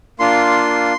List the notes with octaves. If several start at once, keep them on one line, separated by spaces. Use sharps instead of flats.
A#3 D4 F4 C6